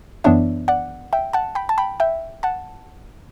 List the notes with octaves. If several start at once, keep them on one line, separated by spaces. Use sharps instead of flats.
F#2 E3 B3 D4 C#5 E5
D5 F#5
E5 G5
F#5 A5
G5 B5
A5
G5 B5
E5 G5
F#5 A5